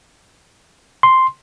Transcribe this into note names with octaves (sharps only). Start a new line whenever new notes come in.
C6